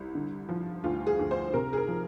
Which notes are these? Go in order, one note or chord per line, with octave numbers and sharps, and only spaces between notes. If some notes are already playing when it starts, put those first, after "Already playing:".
Already playing: C2
D3
F3
D2 F4
G#4
D2
C5
C3 A#4
G#4
A#4
F3